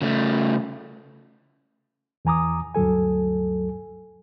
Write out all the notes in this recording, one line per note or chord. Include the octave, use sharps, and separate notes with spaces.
C#3 A3
E2 E3 G#5 A#5 D6 D#6
D2 G2 F#3 A4 G#5